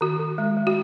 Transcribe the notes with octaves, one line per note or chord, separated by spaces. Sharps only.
D#3 F#4
D#3
G#3
G#3
F#4